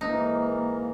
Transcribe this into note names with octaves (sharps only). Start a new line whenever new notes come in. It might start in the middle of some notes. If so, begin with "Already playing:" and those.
G#2 E3 A#3 D#4